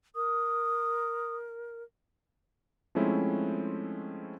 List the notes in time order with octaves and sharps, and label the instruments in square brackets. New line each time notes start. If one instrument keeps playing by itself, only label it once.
[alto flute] A#4 [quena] D#6
[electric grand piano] F3 G#3 A3 C4 C#4 E4